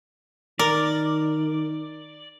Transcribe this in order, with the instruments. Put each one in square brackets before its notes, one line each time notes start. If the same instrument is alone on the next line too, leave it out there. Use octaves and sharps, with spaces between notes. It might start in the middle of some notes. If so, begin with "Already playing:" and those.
[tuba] D#3 [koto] A#4 [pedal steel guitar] D5